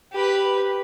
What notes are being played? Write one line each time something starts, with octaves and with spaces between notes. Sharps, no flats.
G4 B4